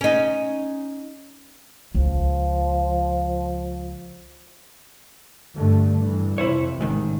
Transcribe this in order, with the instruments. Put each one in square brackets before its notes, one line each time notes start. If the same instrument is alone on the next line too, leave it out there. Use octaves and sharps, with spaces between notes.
[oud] C#4 D#4
[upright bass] C#2 [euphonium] F3
[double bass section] G2 D3 A3
G2 E3
[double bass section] F2 C3 [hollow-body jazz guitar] E4 C5 C#5
[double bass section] A1 [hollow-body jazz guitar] G#2 D#3